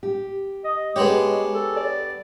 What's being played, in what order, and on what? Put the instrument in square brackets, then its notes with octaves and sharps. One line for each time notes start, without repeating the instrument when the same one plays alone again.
[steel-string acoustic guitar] G4
[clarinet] D#5
[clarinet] G#3 [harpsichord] B3 D4 G4 [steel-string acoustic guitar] G#4 C#5
[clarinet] A4
D5